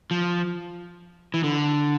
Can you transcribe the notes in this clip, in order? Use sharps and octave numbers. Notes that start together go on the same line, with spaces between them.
F3
E3
D3